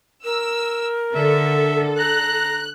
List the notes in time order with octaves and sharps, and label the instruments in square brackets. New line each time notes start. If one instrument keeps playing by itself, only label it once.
[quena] A#4 [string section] E6
[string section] D3 [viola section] A4 [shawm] E5
[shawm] A#5 [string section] F#6